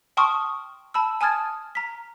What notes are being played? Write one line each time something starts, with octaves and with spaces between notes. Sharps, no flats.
G5 A5 C6 C#6 D#6 F6
A5 B5 E6
G#5 A5 D#6 F6 G#6 A6
A#5 F6 B6